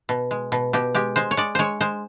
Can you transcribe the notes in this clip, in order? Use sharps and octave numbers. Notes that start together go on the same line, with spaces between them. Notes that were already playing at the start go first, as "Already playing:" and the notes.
B2
G#3
B2
B2 G4
G#3 G4
G#3 C5
C#5
G#3 D5
G#3 C5 C#5
G#3 C5